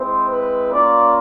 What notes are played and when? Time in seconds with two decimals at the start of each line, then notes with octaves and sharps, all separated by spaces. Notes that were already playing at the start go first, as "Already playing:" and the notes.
Already playing: G#3 C4 E4 C5
0.28 B4
0.71 A#3 C#4 F4 D5